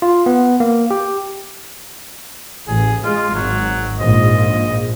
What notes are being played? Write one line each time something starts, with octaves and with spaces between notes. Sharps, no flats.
F4
B3
A#3
G4
A1 G#4
G#3 F4
G#1 F#3
A#1 G#2 D#5